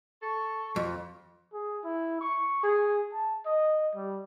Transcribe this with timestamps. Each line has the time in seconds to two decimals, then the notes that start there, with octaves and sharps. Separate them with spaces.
0.22 A4 C#6
0.76 F2
1.53 G#4
1.84 E4
2.21 C#6
2.63 G#4
3.13 A5
3.45 D#5
3.95 G3